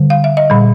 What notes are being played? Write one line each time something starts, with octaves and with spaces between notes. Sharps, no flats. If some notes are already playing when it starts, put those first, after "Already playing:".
Already playing: D3 G3
F5
E5
D#5
A#2 G3